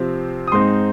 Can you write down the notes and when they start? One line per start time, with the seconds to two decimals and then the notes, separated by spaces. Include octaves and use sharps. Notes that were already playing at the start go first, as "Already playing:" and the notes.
Already playing: C3 F3 C4
0.47 D#6
0.52 G#2 G#3 C4 D#4 C6